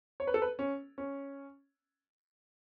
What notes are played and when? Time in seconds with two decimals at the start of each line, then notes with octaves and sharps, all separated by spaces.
0.20 C#5
0.27 B4
0.34 A4
0.42 B4
0.59 C#4
0.98 C#4